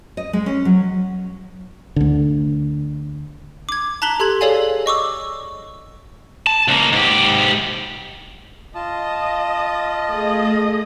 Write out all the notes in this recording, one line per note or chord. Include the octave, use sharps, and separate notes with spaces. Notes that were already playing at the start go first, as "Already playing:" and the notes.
D#5
G#3
C#4
F#3
D2 D3
D6 G#6
A5 A#5 F#6 B6 F#7 G7
G4 A4 C6 G#6 F#7
G#4 A4 C#5 D5 F5 G#5
D#5 C#6 D6 E6
A5
C#2 A#3
G#2 G4
F4 D#5 A5
A3 G#4 D#5